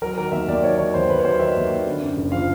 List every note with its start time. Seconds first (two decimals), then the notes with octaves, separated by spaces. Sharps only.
0.02 F#3 A#4
0.18 D#3 A#4
0.32 D#2 E5
0.48 D#2 D5
0.64 F#3 C#5
0.78 D#3 C#5
0.94 D#2 C5
1.09 D#2 B4
1.19 C#5
1.25 F#3 C5
1.39 D#3 E5
1.56 D#2
1.70 D#2
1.86 D3
2.02 F#2
2.17 F#1
2.32 F3 F5